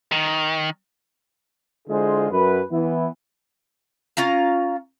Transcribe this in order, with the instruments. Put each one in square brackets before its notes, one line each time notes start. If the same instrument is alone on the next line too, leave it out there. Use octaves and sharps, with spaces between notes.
[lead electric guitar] D#3
[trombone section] D3 G#3 E4 F4 G#4 C5
F#2 B4
E3 B3 E4
[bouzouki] C#4 F4 F5 A#5